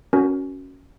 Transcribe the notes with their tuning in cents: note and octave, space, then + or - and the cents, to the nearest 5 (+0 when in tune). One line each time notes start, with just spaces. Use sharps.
C#4 +0 F#4 +0 A#4 +0